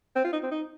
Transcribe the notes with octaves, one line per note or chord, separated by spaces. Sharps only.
C4
F4
D#4
C4
D#4